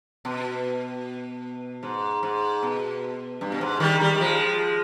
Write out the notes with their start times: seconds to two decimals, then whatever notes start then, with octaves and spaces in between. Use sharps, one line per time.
0.25 B2
1.83 G#2
2.23 G#2
2.63 B2
3.41 G2
3.52 B2
3.61 G#2
3.80 D#3 G3
4.00 D#3 G3
4.15 G3
4.20 F3 G#3